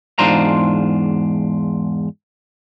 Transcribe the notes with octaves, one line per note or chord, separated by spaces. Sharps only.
E2 G#2 D4 F4 C5 A#5